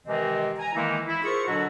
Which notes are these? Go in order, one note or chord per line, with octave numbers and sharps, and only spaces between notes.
C3 D#3 E3 G#3 C4 D#5
G#5 A#5
D#3 E3 G#3 A#3 D#4 E4
E4
F4 G#4 A#4 C5 C#6
B2 D3 F#3 D4 E4 F#4